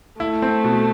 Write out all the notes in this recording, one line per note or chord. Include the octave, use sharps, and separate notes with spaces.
A3 E4
C4
B2